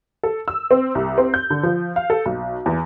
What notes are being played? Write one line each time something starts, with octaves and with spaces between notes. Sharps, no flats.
A4
E6
C4
C2
C4
G6
D3
F3
F5
A4
B1
E2